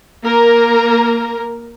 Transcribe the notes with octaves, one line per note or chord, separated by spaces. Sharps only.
A#3 A#4 A#5